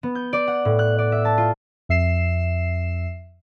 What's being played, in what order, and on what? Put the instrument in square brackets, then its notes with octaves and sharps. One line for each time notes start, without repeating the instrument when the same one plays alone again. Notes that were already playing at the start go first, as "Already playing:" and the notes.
[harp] B3
G6
D5
F#5
A2
F#6
D5
E5
A5
F4
[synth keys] F2 E5 C7 E7